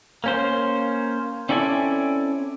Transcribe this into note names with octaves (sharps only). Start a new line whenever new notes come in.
A#3 C#4 C5
C4 C#4 E4 A4 D5 G#5